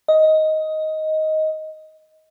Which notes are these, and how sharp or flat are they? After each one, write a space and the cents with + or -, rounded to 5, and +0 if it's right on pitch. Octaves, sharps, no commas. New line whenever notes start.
D#5 +10